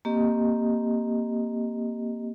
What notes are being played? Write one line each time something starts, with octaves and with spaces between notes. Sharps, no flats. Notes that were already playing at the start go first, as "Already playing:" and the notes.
A#3 C4 G4 D#5